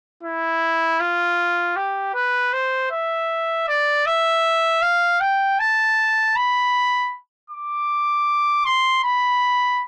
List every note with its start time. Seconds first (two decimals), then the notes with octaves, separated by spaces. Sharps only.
0.23 E4
1.00 F4
1.76 G4
2.14 B4
2.53 C5
2.91 E5
3.68 D5
4.06 E5
4.82 F5
5.20 G5
5.59 A5
6.36 B5
7.50 D6
8.65 C6
9.03 B5